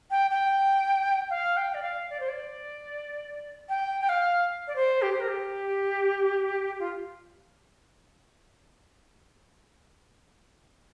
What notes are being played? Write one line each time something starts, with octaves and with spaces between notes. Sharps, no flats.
G5
G5
F5
G5
D5
F5
D5
C5
D5
G5
G5
F5
D5
C5
G4
C5
A#4
G4
F4